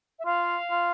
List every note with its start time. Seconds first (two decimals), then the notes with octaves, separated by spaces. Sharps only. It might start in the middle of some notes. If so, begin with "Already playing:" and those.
0.19 E5
0.26 F4 F5
0.71 F4